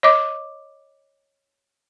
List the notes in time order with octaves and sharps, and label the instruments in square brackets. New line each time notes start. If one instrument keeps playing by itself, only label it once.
[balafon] C#5 D#5 D6